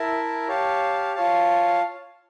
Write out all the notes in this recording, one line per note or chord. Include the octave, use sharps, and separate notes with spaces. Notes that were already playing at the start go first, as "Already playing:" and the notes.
Already playing: E4 A#4 E5 A5
G4 C#5 F5 A5
F4 C#5 F5 A5